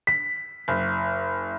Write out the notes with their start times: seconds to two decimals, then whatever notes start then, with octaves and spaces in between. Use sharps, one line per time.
0.07 B6
0.68 F#1